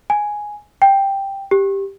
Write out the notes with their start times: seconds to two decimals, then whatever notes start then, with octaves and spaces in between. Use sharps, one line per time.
0.10 G#5
0.82 G5
1.51 G4